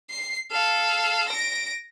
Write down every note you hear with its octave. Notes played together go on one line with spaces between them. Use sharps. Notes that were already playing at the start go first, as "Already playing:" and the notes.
C7
A4 F5
A#6 D7